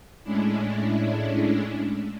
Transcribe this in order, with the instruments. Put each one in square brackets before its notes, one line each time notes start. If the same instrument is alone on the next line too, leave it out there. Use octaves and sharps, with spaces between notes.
[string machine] A2 G#3 C#4 D4 E4